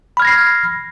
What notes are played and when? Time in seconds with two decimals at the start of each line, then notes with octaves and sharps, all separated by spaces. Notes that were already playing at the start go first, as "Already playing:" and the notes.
0.17 B5
0.20 F6
0.22 G#6
0.25 A#6
0.27 C7